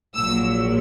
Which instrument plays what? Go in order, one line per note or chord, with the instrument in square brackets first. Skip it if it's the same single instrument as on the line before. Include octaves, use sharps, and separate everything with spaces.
[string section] A#1 A#2 F#3 E6